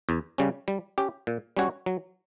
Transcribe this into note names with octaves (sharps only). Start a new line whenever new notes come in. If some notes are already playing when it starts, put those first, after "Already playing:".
E2
C#3 G3 C#4
G3
C#4 G4
A#2
G3 C#4 F#4 C#5
F#3